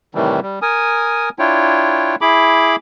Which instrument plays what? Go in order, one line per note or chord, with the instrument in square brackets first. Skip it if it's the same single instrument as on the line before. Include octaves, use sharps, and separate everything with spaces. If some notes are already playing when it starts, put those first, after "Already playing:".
[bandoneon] A2 C3 D#3 E3 G3
G3
A#4 G#5 D#6
D4 E4 F4 C#5 G5
E4 G#4 B5 D6